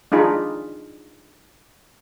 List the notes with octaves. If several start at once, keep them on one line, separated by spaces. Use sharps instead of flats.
D4 D#4 F4 G#4 B5